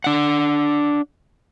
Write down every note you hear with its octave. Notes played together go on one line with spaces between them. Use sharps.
D4 F#5